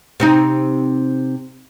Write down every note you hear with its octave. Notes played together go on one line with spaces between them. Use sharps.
C3 C4 D#4